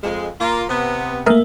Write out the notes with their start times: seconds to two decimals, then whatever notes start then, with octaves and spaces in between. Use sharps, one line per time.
0.03 F2 G#3
0.40 A#3 F4
0.69 C3 B3
1.26 A3 A#3 G#4 A#4 E5